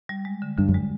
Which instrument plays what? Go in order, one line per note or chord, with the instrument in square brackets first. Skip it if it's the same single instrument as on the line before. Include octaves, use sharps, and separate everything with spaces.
[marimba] G3
G#3
D3
[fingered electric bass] G2 [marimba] D3
[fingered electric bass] F#2
[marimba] G#3